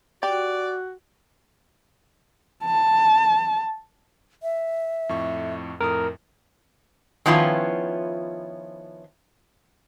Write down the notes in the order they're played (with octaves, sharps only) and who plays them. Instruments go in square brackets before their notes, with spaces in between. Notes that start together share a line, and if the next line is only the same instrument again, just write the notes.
[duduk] F#4 [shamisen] G4 [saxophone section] D5
[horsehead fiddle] A5
[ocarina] E5
[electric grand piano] F2 A2 C#6
[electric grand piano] F2 A2 D#6 [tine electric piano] A#4
[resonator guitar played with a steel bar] D#3 F3 B3 C#4 E4 F4